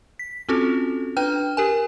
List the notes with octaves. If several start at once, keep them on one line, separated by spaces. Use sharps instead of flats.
B6
C4 C#4 F4 F#4 A4
D4 B4 G5 F6
G4 A#4 G#5